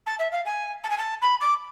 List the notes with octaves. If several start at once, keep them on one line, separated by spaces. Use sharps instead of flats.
A5
E5
F5
G#5
A5
G#5
A5
B5
D6